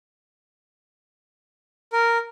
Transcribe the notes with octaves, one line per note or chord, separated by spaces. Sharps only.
A#4